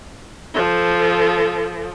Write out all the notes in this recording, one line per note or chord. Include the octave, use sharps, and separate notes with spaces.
F3 A4